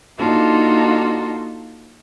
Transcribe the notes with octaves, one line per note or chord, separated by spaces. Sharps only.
A#3 D4 D#4 F4 F#4 A4